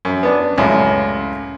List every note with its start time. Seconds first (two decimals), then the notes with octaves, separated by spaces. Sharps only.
0.05 F#2
0.23 B3 D4
0.58 C#2 F#2 A2